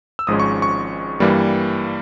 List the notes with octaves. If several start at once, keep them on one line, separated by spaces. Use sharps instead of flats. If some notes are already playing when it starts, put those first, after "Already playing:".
E6
G#1 G#2 F3 G#3 C#4 D#6
C#6
C#6
G2 E3 G3 A#3